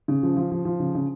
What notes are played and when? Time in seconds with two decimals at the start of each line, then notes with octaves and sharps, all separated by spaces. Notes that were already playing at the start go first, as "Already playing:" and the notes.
0.08 C#3
0.23 F3
0.37 F3
0.52 F3
0.65 F3
0.80 C#3
0.95 C#3